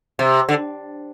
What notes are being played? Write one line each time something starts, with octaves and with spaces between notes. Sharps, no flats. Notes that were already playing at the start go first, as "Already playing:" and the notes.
C3
D3